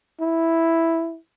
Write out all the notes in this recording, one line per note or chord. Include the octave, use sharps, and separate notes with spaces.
E4